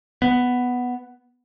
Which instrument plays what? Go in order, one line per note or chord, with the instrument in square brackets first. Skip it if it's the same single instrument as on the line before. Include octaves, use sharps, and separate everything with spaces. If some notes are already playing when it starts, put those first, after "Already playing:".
[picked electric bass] B3